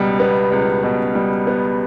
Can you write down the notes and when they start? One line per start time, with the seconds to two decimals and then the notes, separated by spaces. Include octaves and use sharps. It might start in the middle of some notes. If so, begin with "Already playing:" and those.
Already playing: C#2 B2 G3
0.20 B3
0.52 C#2
0.83 B2
1.15 G3
1.47 B3